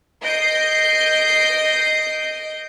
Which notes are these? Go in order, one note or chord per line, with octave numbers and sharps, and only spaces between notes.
D#5 G6 C7 D7